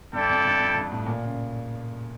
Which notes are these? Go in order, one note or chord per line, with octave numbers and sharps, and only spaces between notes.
G2 E4 A4 D5 G5
F2
G2
F2
G2
A2
A#2
C#3